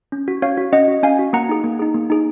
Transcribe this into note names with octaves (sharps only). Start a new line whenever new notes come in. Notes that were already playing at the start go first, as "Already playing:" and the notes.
C#4
F#4
C#4 C#5 F5
F#4
C#4 D#5 F#5
F#4
C#4 F5 G#5
F#4
A#3 F#5 A#5
D#4 G#4
A#3
D#4 G#4
A#3
D#4 G#4